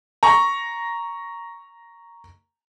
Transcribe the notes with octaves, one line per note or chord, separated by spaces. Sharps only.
A#5 C#6